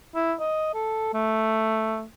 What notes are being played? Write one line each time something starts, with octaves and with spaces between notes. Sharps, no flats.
E4
D#5
A4
A3